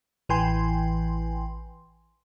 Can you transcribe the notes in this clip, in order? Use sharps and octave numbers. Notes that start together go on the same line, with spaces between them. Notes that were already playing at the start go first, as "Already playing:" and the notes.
A1 E3 B4 G5 G#5 C6